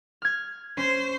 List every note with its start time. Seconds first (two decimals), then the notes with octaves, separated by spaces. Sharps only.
0.22 F6 G#6
0.77 C#4 C5